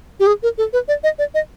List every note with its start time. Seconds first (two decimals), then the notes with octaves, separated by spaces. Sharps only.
0.20 G4
0.27 G#4
0.43 A#4
0.58 A4
0.73 B4
0.88 D5
1.03 D#5
1.19 D5
1.34 D#5